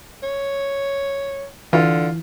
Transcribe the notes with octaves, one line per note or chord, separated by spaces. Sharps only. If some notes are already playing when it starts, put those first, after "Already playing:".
C#5
D3 E3 F4